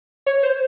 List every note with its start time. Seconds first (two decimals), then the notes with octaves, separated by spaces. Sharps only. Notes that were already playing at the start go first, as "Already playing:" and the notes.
0.26 C#5
0.43 C5